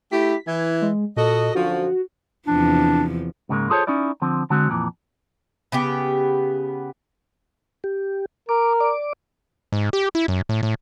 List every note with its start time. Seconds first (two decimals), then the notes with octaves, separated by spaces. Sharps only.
0.12 A3 E4 G4 B6
0.47 E3 G#6
0.82 G#3
1.17 A#2 F#4 A4 D#5
1.55 F#2 D3 F3 F#4
2.47 E2 C3 F3 D4
3.49 G#2 C#3 E3 G3 G#3 A#3
3.70 F4 G#4 A4 C5 C#5
3.87 C#4 D#4 E4 D5
4.22 D3 F3 C4
4.50 D3 G#3 C4 F#4
4.70 F2 A#2 E3
5.72 C#3 B3 G4
7.84 G4
8.49 A#4 D6
8.80 D5 D6
9.72 G#2
9.93 G4
10.15 E4
10.28 F#2
10.49 A2
10.63 A2